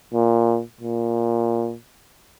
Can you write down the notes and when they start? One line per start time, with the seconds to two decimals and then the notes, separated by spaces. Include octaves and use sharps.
0.14 A#2
0.81 A#2